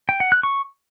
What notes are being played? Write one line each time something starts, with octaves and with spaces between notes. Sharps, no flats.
G5
F#5
F#6
C#6